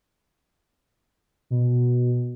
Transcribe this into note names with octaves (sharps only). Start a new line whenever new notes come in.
B2